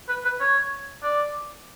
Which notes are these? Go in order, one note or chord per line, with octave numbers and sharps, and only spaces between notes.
B4
B4
C#5
D5